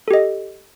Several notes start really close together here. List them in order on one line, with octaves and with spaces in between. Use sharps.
A4 G4 D#5